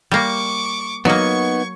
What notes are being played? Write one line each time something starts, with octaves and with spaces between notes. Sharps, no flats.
G3 A#3 C#6 D6
F#3 A#3 B3 D#4 D#5 C#6 G#6